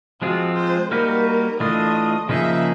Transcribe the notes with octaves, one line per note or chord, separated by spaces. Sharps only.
F3 G#3 C4 F4 F#4
C5
G3 A#3 D#4 F#4 A#4 B4
E3 A3 D4 F4 D#5
C#3 F3 A#3 D#4 G#4 E5